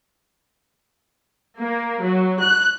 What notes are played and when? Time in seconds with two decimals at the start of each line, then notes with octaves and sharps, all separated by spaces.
1.57 A#3
2.02 F#3
2.41 F#6